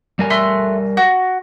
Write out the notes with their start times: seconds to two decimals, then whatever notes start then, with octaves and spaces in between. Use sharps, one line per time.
0.19 G3 A#4 G#5
0.30 A3 C6 F#6
0.97 F#4